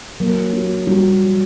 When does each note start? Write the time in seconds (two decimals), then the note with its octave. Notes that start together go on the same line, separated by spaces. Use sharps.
0.20 F#3 A#3
0.53 F#3
0.87 F#3 G3